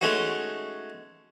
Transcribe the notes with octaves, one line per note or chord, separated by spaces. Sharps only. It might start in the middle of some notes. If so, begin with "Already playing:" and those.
G#3 A3 C#4 D#4 F#4